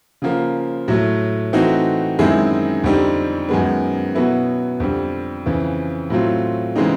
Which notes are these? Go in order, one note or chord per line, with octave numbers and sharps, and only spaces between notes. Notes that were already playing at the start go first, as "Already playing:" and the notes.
C#3 F3 A#3
A2 F#3 A3
E3 A3 C4 D#4 F#4
F#2 D#3 G#3 C4 E4
F2 D3 G3 C4 D#4
F#2 D#3 G#3 B3
B2 F#3 B3 E4
F2 D3 G3
F2 C#3 E3
A2 F#3 A3 C4 F4
C#3 E3 G#3 C4 D#4